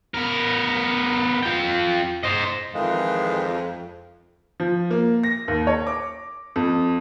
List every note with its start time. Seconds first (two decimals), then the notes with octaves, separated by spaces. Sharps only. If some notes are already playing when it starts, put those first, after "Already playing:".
0.14 B3 A#4
1.43 F4 G5
2.23 C5 D#5
2.74 F2 D#3 E3 G#3 F5
4.60 F3
4.91 A#3
5.23 A#6
5.48 D#2
5.67 C#5
5.87 D6
6.56 F2